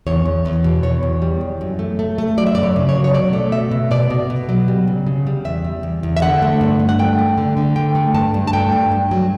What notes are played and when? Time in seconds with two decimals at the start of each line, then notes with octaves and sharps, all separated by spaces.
0.07 E2 C#5
0.26 E2
0.45 E2
0.64 B2
0.83 E2 C#5
1.03 E2
1.22 G3
1.41 E2
1.61 F#2
1.79 A3
1.99 A3
2.18 A3
2.37 F#3 D5
2.47 E5
2.55 F#2 D5
2.63 C#5
2.76 C#3
2.89 C#5
2.95 F#3
3.04 C#5
3.14 B2 D5
3.33 A3
3.52 B2 E5
3.71 B2
3.91 B2 D5
4.10 B2
4.30 B2
4.49 F#3
4.68 G3
4.88 C#3
5.07 C#3
5.27 G3
5.45 E2 E5
5.64 G3
5.83 E2
6.03 E2
6.17 E5
6.22 D3 F#5
6.42 A3
6.61 G2
6.79 G2
6.89 F#5
6.99 A3 G5
7.19 A3
7.38 D3
7.57 D3
7.76 A3 G5
7.95 A3
8.14 G2 A5
8.34 G2
8.47 A5
8.53 A3 G5
8.72 G2
8.92 G2
9.11 F#3